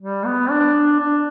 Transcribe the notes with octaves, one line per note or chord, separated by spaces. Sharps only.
G3
B3
D4
D4